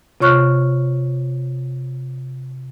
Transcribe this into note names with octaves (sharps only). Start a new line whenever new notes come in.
C3 F4 C#5 C#6 F6 F#6